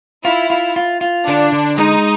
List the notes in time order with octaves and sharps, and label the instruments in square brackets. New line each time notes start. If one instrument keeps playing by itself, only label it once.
[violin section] E4 [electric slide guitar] F4
[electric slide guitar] F4
F4
F4
[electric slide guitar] D3 [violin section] D4
[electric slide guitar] D3
[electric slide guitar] G#3 [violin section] D#4